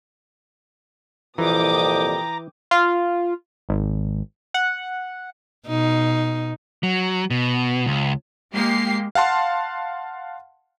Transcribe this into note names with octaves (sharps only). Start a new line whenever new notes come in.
C2 F2 A#2 E3 G5 A#5 D6 D#6
F4
G#1
F#5
B2 D#4
F#3
B2
C#2
G#3 A#3 G4 C7
F5 F#5 A5 C6